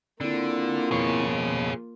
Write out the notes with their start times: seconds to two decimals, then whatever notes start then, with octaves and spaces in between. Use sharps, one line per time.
0.21 D3 A#3 C4 E4 F4
0.91 F2 B2 G#4 C#5